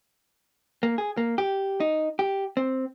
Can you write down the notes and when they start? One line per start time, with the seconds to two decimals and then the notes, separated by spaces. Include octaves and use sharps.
0.83 A#3
0.98 G#4
1.17 A#3
1.38 G4
1.80 D#4
2.19 G4
2.57 C4